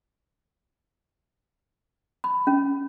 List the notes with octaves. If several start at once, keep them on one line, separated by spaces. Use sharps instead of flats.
B5
C#4